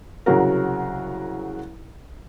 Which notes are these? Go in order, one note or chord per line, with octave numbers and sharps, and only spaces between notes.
C2 C#3 F#3 F#4 A#4